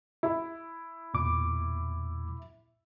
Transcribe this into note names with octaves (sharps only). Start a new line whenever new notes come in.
E4
E2 A#2 D6